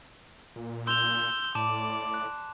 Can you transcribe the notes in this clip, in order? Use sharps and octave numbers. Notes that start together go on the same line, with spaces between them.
A#2
C6 E6 G6 F7
A2 D5 A5 D6 E7
F#6